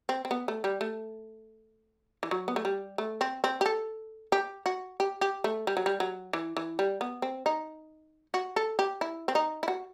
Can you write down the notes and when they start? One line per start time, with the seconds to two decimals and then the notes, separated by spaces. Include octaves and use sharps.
0.09 C4
0.25 C4
0.31 B3
0.48 A3
0.64 G3
0.81 A3
2.23 E3
2.31 F#3
2.48 B3
2.56 A3
2.65 G3
2.98 A3
3.21 C4
3.44 C4
3.61 G4
3.66 A4
4.32 G4
4.66 F#4
5.00 G4
5.21 G4
5.44 A3
5.67 G3
5.77 F#3
5.86 G3
6.00 F#3
6.33 E3
6.57 E3
6.79 G3
7.01 B3
7.22 C4
7.46 D#4
8.34 F#4
8.56 A4
8.79 G4
9.01 E4
9.28 C4
9.35 D#4
9.63 E4
9.68 F#4